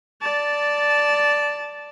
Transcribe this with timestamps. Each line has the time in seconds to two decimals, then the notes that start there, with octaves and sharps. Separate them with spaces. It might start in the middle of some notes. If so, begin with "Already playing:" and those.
0.21 D5 A5